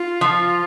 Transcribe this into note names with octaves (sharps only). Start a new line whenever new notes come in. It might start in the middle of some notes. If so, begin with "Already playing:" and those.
Already playing: F4
F3